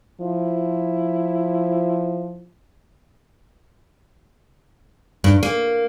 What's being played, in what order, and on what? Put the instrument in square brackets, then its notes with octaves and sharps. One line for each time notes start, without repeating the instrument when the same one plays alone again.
[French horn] F3 [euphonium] E4
[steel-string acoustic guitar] G2
A#3